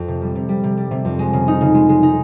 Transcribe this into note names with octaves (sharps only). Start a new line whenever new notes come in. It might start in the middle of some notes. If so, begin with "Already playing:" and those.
Already playing: F2
C3
G3
C3
G3
C3
G3
C3
F2
G#3
C#3
D#4
C#3
G#3
G#3
D#4